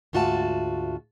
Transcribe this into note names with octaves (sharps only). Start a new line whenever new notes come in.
D2 G#2 F4 F#4 E5 A5